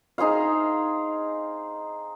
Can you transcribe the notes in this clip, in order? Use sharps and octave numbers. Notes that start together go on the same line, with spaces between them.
D#4 G#4 C5 F5